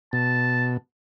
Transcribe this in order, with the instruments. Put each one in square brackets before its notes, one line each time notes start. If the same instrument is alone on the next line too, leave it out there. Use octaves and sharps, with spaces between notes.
[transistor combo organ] B2 [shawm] A5